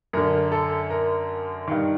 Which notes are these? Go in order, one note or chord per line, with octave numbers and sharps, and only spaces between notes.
F#2 D3 A#4
A4
A#4
G2 D#3